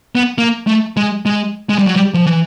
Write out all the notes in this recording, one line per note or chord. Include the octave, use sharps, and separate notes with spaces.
B3
A#3
A3
G#3
G#3
G#3
G3
F#3
G3
F3
E3